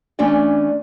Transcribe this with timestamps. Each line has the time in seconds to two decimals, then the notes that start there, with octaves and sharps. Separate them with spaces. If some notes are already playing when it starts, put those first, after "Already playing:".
0.19 E3 A3 C#4 D4 D5